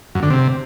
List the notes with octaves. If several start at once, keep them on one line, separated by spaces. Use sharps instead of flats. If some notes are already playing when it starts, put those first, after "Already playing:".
F#2
D3
C3